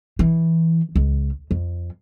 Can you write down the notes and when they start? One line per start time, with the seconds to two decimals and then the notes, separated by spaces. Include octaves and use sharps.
0.19 E3
0.96 C#2
1.51 F2